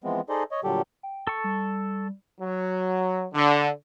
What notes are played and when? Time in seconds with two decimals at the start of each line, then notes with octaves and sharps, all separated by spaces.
0.04 E3 F3 G#3 B3 C4
0.29 D#4 G#4 A4 C5 D5 D#5
0.52 C#5 D#5
0.64 A#2 D3 F#3 G3 G4 A4
1.03 G5
1.27 A4 C#6
1.44 G3
2.40 F#3
3.34 D3